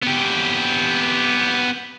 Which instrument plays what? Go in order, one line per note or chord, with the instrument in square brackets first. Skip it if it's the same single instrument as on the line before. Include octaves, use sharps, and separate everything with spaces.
[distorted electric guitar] B3 G4